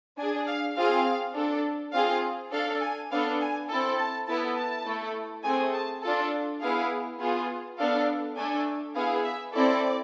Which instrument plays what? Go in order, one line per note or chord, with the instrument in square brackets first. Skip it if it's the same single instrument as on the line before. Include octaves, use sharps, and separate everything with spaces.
[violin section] D4 G#4 G#5
F5
C4 F4 G#4 F5
D4 A4
C4 F4 G#4 F5
D4 A4 F5
G#5
B3 D4 A4 F5
G#5
C4 E4 A4 A5
A5
B3 E4 A4 A5
A5
A3 E4 A4
A3 C4 G#4 G#5
A5
D4 F4 A4 A5
B3 E4 G#4 F5
B3 F4 G#4
B3 D4 A4 F5
A3 D4 A4 G#5
B3 E4 G#4 F5
E5
C4 E4 A4 D5